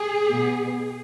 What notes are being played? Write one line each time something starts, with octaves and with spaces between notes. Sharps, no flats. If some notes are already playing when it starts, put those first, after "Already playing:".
Already playing: G#4
B2 B3